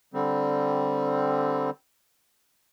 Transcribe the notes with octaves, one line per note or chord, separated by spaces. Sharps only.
D3 G3 C4